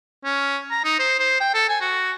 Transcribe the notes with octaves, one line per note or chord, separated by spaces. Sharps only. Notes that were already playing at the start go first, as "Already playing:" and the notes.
C#4
A#5
D#4
C5
C5
G5
A4
G#5
F#4